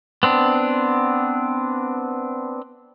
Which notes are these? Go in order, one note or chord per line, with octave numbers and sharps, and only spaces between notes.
B3 C4 D4